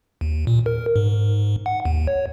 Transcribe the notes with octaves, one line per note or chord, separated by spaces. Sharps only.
D#2
A#2
A#4
G#2
G#2
F#5
D#2
C#5